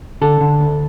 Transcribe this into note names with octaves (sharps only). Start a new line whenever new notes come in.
D3 A4
D3
D2